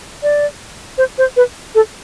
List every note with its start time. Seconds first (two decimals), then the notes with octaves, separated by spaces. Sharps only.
0.23 D5
0.98 C5
1.18 C5
1.36 B4
1.75 A4